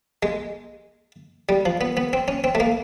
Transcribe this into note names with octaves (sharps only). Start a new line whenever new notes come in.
G#3
G3
F3
B3
B3
C4
C#4
C4
A3
A#3